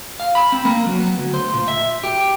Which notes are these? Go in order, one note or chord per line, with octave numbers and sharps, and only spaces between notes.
F5
B5
C4
A#3
F#3
B3
D2
C5
A#2
E5
G4